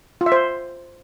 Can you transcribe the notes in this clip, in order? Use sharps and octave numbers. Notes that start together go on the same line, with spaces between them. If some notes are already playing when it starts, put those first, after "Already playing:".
F4
E5
C5